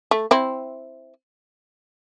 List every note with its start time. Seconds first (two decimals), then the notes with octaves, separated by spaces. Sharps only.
0.11 A3
0.31 C4 E4